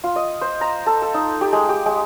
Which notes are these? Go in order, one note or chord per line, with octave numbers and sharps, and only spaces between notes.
F4
D#5
C5
A#5
A4
A4
D#4
G4
G#3
G4
G#3